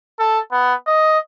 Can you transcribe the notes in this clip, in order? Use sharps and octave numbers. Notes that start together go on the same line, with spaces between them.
A4
B3
D#5